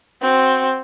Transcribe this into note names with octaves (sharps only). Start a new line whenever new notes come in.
C4 F#4